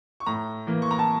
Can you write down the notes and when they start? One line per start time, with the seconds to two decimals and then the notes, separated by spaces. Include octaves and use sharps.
0.20 C#6
0.26 A2 A#5
0.67 E3 A#3
0.82 C#6
0.91 A#5
0.99 A5